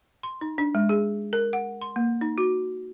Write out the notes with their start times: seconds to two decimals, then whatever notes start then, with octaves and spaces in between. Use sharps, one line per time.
0.23 C6
0.41 D#4
0.58 D4
0.75 G#3
0.89 G#4
1.33 A#4
1.53 F#5
1.82 C6
1.96 A#3
2.21 D#4
2.38 F#4